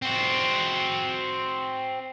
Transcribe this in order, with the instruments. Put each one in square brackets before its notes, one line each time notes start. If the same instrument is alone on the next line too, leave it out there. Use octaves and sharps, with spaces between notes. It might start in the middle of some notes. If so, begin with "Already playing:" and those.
[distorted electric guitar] C4 F#4